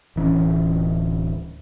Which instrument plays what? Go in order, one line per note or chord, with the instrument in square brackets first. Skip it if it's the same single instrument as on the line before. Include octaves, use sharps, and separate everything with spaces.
[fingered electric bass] D1 E3 C#4